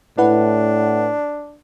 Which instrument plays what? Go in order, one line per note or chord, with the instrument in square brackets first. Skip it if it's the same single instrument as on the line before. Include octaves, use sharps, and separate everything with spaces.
[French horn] A2 [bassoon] D4 [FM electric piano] E4 B4 F#5